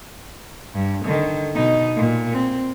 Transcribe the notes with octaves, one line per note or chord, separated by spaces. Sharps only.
G2
D3 D#3
B2 D#4
A#2
C4